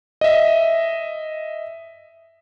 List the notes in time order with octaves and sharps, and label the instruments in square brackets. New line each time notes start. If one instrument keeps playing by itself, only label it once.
[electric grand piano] D#5 E5